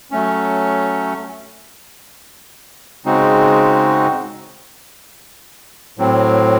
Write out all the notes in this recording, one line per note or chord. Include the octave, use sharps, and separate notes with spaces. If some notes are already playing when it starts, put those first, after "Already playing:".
F#3 A3 C#4
C#3 G#3 C4 D#4 F#4
A2 F#3 C4